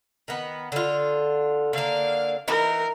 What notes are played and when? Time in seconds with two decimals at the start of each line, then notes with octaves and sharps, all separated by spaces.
0.28 D#3 B3
0.72 D3 F4
1.73 D3 A#3 F5
2.48 E3 D#4 A#4